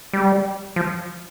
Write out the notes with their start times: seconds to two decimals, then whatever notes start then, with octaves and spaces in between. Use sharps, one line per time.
0.13 G3
0.76 F3